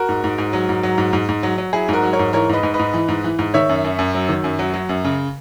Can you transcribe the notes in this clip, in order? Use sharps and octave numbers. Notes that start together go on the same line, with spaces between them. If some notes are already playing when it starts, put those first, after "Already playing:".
Already playing: F#4 A#4
G#2
G#2
G#2
F#3
G#2
F#3
G#2
G#2
G#2
F#3
F#3
F#3 E4 G#4
G#2 F#4 A#4
F#3
A#4 C#5
G#2
E3 A#4 C#5
G#2 B4 D#5
G#2
B4 D#5
G#2
E3
G#2
E3
G#2
D#3 C#5 E5
F#2
F#2
F#2
F#3
D#3
F#2
F#3
F#3
F#2
C#3